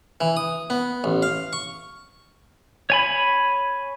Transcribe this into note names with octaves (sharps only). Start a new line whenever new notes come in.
E3
D#6
B3
A1
F5
C#6
C#5 G#5 B5